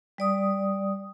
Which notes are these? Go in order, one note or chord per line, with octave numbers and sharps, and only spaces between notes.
G3 D5 D#6